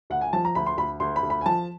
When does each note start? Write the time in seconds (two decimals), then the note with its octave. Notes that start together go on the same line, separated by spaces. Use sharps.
0.10 D2 F#5
0.21 G#5
0.33 F3 A5
0.45 A#5
0.55 D2 B5
0.66 C6
0.78 D2 B5
1.00 D2 C6
1.16 B5
1.23 D2
1.30 B5
1.41 G#5
1.46 F3 A5